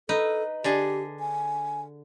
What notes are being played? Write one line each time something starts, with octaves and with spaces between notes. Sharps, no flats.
D#4 A4 B4
D3 D4 G4 G#4
G#5